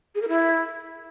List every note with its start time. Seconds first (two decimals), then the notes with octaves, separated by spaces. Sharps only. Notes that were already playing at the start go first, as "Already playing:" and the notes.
0.14 G#4
0.21 A#4
0.28 E4